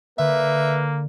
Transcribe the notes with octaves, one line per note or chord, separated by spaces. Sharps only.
D3 A#3 B4 E5